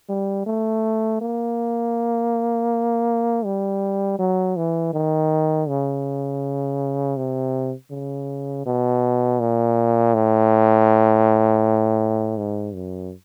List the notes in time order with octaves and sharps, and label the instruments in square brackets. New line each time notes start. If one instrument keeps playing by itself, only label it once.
[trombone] G3
A3
A#3
G3
F#3
E3
D#3
C#3
C3
C#3
B2
A#2
A2
G#2
F#2